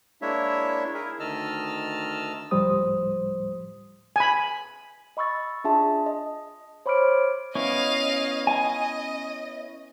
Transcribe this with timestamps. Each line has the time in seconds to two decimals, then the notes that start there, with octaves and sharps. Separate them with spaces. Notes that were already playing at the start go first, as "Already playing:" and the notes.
0.22 G#3 A#3 D4 E4 C#5 E5
0.94 E4 G#4 A#4 E5
1.20 D2 D#3 D#5 A5 E6 F6
2.51 D2 A2 F3 G3 C5 D#6
4.16 G#5 B5
5.17 D#5 B5 C#6 E6 A6
5.64 D4 F4 G#4 E5 A5
6.06 D#5
6.86 C5 C#5 B5 D6 F6 D7
7.55 B3 C#4 E4 D#5 F5
8.47 D#5 G#5